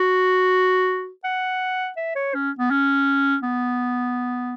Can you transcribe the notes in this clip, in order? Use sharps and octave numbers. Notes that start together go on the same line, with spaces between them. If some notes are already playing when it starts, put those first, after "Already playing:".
Already playing: F#4
F#5
E5
C#5
C#4
B3
C#4
B3